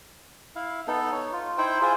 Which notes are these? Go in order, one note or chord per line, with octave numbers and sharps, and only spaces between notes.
E4 F5
B3 D#4 A4
D#4 C#5
F4
D#4 E4 C5 G5
E4 F4 G#4 C5